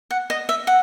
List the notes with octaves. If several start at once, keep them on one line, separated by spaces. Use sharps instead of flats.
F#5
D#5
E5
F#5